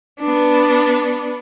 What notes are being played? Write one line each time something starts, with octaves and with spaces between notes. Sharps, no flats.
B3 D4